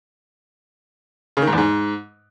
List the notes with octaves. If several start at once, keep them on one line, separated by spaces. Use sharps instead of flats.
C#3
D#3
G#2
E2
G#2